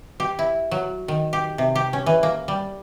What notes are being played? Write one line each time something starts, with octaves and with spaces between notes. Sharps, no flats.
G4
E4
F#3
D#3
G4
C3
G4
C#4
E3
A#3
G3